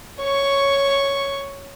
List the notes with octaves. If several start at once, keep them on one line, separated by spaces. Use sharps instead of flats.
C#5 C#6